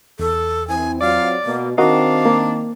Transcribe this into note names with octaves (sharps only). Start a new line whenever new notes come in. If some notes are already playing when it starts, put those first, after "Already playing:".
E2 A4
E3 C4 G#5
F#3 C4 F4 D5 F5
B2 A#3
D#3 C4 D4 F#4 A#4 D#5 F5
A#3